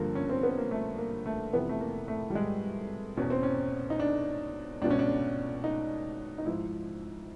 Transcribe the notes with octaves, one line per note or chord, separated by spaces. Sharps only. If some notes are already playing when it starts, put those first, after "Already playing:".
Already playing: G2 D3 F3 A#3
C#4
C4
B3
A#3
A3
A#3
A3
F2 C3 E3 B3
A3
A#3
A3
G3
G#3
E2 B2 C#4
C4
C#4
D#4
D4
C#2 B2 D4
C#4
D4
D#4
D#4
G#2 F3 E4